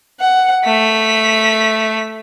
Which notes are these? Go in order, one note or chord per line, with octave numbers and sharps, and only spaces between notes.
F#5
A3 B6